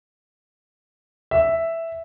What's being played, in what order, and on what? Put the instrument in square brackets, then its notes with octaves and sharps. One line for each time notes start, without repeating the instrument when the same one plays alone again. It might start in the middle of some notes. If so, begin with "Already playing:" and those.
[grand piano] E5